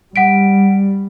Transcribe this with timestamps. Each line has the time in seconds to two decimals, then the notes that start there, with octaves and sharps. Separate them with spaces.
0.16 G3 F#5 B6 D7